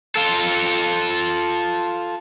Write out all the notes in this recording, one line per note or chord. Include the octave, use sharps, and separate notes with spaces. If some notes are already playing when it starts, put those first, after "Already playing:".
F4 A4